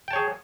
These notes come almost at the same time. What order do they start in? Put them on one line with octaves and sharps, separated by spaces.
G5 A5 C#5 G#4